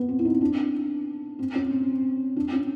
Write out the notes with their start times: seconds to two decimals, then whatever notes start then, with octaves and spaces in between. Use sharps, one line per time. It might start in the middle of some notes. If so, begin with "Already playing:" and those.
Already playing: B3
0.09 C4
0.19 E4
0.25 D#4
0.41 D4
1.39 C4
1.55 C#4
1.71 C4
2.36 D4
2.53 C#4